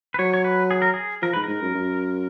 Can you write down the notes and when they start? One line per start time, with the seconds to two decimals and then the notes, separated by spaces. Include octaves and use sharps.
0.14 B4
0.19 F#3 C#5
0.34 C#5
0.44 B4
0.71 G#4
0.82 A#4
0.94 G#4
1.22 F3 A#4
1.33 G#2 B4
1.44 G#2 A#4
1.62 F#2
1.74 F#2